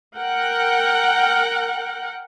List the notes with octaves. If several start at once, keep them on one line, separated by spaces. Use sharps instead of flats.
A#4 F#5 G5